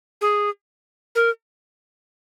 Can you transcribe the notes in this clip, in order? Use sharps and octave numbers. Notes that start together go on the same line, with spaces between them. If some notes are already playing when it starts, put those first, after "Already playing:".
G#4
A#4